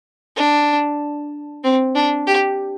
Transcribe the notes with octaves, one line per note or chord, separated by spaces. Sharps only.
D4
C4
D4
G4